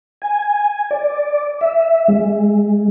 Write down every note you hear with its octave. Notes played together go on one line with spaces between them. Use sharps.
G#5
D5
E5
G#3